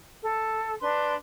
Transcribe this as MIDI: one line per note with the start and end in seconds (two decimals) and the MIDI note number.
0.24 0.73 69
0.81 1.14 62
0.81 1.14 71
0.81 1.14 84